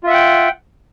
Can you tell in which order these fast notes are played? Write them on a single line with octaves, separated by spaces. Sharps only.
F4 E5 F#5 G5